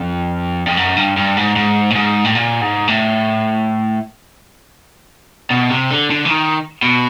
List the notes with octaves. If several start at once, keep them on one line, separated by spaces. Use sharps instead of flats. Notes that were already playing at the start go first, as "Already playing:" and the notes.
Already playing: F2
F2
F#2
G2
G2
G#2
G#2
A2
G#2
A2
A#2
G#2
A2
B2
C3
D3
D3
E3
D#3
B2